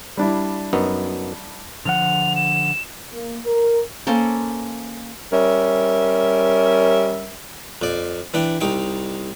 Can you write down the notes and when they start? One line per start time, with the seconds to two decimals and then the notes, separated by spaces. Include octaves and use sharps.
0.17 G3 D4 E4
0.73 F#2 B3 D#4
1.85 D3 F3 F#5 F7
2.36 E7
3.13 A#3
3.45 A#4
4.07 A#3 C#4 A4 C5
5.32 G3 C#4 A#4 E5
7.82 F2 D5
8.34 E3 D4 G5
8.61 C2 D#4 G5